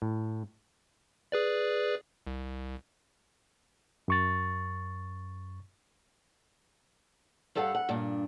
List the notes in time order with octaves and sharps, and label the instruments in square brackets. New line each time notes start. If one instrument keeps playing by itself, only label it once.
[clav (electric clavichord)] A2
[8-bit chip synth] G#4 B4 D5
C2
[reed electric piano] F#2 C#6 A6
[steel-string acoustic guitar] G2 G3 A4 F5 F#5
F#5
G2 A#2 D4